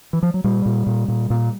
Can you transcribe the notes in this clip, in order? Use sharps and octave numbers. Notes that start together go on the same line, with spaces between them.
E3
F3
F#3
A#2 G3
A#2
A#2
A#2
A#2